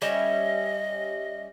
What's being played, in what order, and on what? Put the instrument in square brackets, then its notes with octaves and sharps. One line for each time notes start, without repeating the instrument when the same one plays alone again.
[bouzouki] G3 C#4 E5 [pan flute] D#5